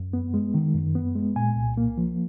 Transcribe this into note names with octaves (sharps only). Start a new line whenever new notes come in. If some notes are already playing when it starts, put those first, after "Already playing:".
Already playing: F#2
B3
G#3
D#3
F#2
B3
G#3
A#2 G#5
C2
A#3
F3